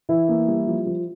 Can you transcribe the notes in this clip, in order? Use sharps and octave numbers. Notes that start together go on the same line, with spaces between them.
E3 E4
A#3
G3
F3
F3